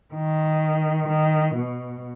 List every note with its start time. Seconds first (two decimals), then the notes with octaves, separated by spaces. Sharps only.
0.15 D#3
1.08 D#3
1.55 B2